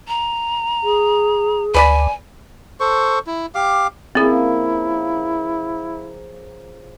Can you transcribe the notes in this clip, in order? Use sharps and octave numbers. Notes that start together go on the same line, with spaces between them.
A#5
G#4
D2 B4 D5 G#5 B5
A4 C5 C#6
E4
G4 F5 D6
C#3 F3 A#3 C4 E4 G#4